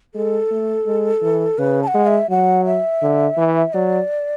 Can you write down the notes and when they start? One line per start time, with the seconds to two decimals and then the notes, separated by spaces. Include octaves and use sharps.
0.15 G#3 A4
0.51 A3
0.86 G#3
1.22 E3
1.58 C#3 B4
1.83 A5
1.87 F#5
1.94 G#3
2.07 E5
2.30 F#3 F#5
2.66 E5
3.02 D3
3.37 E3
3.73 F#3 D5